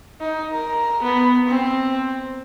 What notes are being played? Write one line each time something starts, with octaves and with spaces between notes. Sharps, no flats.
D#4
A#4
B3
C4